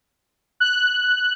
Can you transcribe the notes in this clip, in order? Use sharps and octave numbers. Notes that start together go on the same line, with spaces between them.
F#6